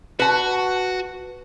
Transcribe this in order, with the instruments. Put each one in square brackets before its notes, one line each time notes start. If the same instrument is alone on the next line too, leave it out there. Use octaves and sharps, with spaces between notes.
[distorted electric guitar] F#4 [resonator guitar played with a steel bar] B4 A5